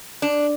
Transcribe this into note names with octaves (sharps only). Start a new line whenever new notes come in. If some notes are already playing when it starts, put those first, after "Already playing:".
D4